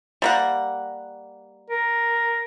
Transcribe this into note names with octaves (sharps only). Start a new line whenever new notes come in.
G3 A#3 F#5
A#4